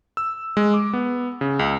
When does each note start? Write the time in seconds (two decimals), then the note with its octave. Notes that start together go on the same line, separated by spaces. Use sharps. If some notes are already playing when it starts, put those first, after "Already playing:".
0.17 E6
0.57 G#3
0.74 D6
0.93 B3
1.41 C#3
1.59 C#2